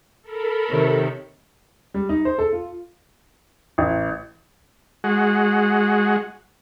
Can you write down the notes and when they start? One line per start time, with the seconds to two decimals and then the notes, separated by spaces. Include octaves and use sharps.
0.22 A4 A#4 B5
0.70 C3 D#3 C#5
1.94 G3
2.09 D#4
2.25 C5
2.38 A4
2.52 F4
3.78 A1
5.04 G#3 F#4